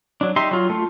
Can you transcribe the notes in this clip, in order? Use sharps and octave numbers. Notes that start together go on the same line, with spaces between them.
F#3 D4
D#4 G4 E5 C6
F#3 F4
A3 F4